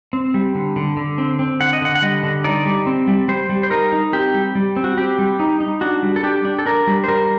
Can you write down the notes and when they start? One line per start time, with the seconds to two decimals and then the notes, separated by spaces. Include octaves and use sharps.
0.13 C4
0.34 G3
0.55 D3
0.76 D3
0.97 D3
1.18 C4
1.39 C4
1.60 D3 F#5
1.73 D#5
1.82 D3 F#5
1.95 F#5
2.02 G3 D#5
2.23 D3
2.44 D#4 D5
2.66 G3
2.86 C4
3.08 G3
3.28 G3 C5
3.50 G3
3.63 C5
3.71 D#4 A#4
3.92 D#4
4.13 C4 G4
4.34 G3
4.55 G3
4.76 C4
4.84 F#4
4.97 C4 G4
5.19 G3
5.40 D#4
5.60 D#4
5.81 D4 F#4
6.03 G3
6.16 A4
6.23 D4 G4
6.45 D4
6.59 A4
6.66 D4 A#4
6.87 G3
7.04 C5
7.08 G3 A#4